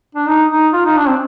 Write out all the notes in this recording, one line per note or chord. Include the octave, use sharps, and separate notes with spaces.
D4
D#4
D#4
F4
D#4
D4
C4